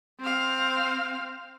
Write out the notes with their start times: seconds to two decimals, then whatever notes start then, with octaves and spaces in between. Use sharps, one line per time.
0.20 C4 F5